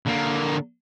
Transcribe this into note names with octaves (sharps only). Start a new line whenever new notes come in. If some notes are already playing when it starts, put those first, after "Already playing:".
D3 A#3